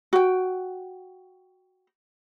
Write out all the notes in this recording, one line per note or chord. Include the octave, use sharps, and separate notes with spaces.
F#4 G5